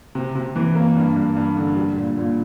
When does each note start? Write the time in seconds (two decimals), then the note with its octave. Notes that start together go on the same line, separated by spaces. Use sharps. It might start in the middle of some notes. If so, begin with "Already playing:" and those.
0.15 C3
0.35 C3
0.56 E3
0.75 A#3
0.96 G2
1.16 G2
1.37 G2
1.56 D3
1.76 G3
1.96 A#2
2.17 A#2